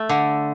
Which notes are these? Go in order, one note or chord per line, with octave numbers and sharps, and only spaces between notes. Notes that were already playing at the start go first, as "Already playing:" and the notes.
Already playing: A3
D3